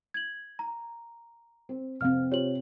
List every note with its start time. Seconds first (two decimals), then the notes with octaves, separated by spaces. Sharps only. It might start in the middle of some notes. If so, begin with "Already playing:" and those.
0.14 G#6 F#7
0.59 A#5
1.69 C4
2.01 F1 C3 C4 F5 F6
2.32 F4 G4 C5 C#5 F#7